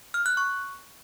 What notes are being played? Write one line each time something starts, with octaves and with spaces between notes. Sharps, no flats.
F6
F#6
C#6